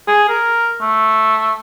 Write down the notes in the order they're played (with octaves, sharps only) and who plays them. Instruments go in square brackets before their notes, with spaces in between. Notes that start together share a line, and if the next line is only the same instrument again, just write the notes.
[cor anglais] G#4
A#4
A3